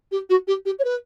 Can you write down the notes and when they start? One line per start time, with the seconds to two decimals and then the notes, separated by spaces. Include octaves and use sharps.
0.12 G4
0.29 F#4
0.47 G4
0.65 G4
0.79 C#5
0.84 B4